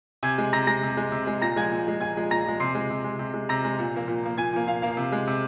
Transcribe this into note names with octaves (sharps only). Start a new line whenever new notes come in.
C3 G#5 G#6
G#3
C3 A#5 A#6
G#3 A#5 A#6
C3
G#3
C3
G#3
A#2 A#5 A#6
F3 G#3 G#5 G#6
A#2
F3 G#3
A#2 G#5 G#6
F3 G#3
A#2 A#5 A#6
F3 G#3
C3 C6 C7
G#3
C3
G#3
C3
G#3
C3 A#5 A#6
G#3
A#2
F3 A#3
A#2
F3 A#3
A#2 G#5 G#6
F3 A#3
A#2 F5
F3 A#3 F5
C3
G#3
C3